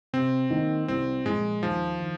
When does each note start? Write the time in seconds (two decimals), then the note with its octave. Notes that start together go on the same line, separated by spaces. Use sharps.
0.13 C3 C4
0.50 D#3 A#3
0.88 C2 C4
1.25 A#2 F3 G#3
1.63 D#2 F3
2.00 D#3